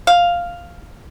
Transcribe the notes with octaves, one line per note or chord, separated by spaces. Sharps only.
F5